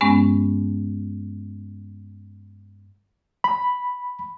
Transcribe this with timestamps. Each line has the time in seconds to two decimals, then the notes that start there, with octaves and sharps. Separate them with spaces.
0.01 G2 G#3 B3 C#4
3.44 B5